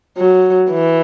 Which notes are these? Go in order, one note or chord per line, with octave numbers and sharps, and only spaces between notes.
F#3
E3